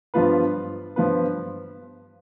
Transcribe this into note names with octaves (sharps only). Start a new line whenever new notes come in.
G2 F3 B3 F4 B4
G2 F3 B3 F4 B4